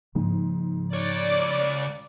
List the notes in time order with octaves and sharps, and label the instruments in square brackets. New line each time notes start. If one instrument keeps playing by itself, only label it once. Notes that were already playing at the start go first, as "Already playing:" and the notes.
[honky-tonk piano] G#2 [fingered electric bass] C#3 F3 A#3
[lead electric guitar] C#2 C#5 [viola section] D5